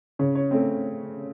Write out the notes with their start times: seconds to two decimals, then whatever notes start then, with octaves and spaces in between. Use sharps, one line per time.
0.19 C#3 C#5
0.35 C#5
0.51 A3 C4 C#5